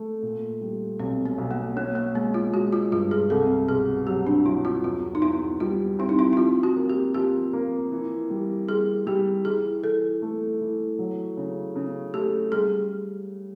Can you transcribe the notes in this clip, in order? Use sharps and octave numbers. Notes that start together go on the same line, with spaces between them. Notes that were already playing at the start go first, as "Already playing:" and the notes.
Already playing: A3
A#2
G3
B1 C4
B3
B1
A#3
A#3 C#4
A#3
G#3 B3
F4
G#3 F#4
F4
G2 F4
G#4
C2 A4
B2 G#4
F#3 G4
D4
F#3 E4
F4
E2 F4
D#4
E2 E4
G3 F4
C4 E4
D#4
E4
E4
F3 F4
F#4
A#3
G4
F3 G4
A#3
E3
G3
G3 G#4
G3 G4
E3 G#4
E3 A4
A3
E3
F#3
C#3
C#3
A3 G4
G3 G#4